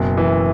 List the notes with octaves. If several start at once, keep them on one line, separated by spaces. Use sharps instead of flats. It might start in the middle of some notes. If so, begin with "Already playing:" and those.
Already playing: F#1 B2
E3